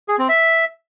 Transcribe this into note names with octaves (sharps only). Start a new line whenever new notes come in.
G#4
C4
E5